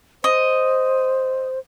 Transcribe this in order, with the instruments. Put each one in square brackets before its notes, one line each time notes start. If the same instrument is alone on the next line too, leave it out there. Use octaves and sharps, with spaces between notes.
[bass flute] C5 [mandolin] D#5